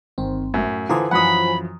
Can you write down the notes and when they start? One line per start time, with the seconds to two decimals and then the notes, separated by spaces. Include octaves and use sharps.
0.18 G1 D#3 C4
0.54 F#2 A2 E5
0.89 D3 E3 F4 C5 G#5 A#5 D#6
1.11 F#2 E3 F3 F#5 B5 D#6